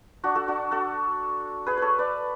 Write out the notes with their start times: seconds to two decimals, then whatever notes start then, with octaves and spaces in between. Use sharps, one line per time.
0.24 D4 F#4
0.35 F#4 A4
0.48 D4 F#4
0.71 F#4 A4
1.66 G#4 B4
1.77 A4 B4 C#5
1.99 B4 D5